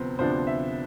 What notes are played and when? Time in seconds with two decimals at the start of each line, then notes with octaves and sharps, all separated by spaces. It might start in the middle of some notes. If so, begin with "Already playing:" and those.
Already playing: D2 C3 F3 B3 C5
0.19 D2 C3 F3 B3 D4 C5
0.47 E5